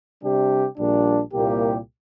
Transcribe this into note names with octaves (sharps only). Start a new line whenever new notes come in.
C3 G3 D4 G4
A#1 A#2 G3 D4
C2 A#2 A#3 G4